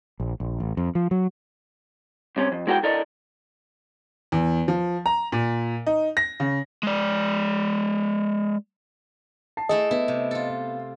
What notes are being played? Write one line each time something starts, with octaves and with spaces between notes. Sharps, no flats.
A#1
A#1
A1
F2
F3
F#3
C2 C3 C#4
F2
G#3 E4 F#4 A#4 C#5 G5
E4 A4 A#4 D5 D#5
E2
F3
A#5
A#2
D#4
A#6
C#3
G#3 D5
A5 C7
A3 E4 G#4 A4 D#5
B3 E4
C3
F4 A4